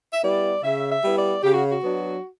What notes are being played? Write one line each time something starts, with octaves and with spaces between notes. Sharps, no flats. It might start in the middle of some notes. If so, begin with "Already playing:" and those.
E5
G3 B3 E4 D5
C#3 E5
E5
G3 B3 E4
D5
C#3 G4
F#4
F#4
F#3 B3 D4